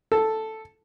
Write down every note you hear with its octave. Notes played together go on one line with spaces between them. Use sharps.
A4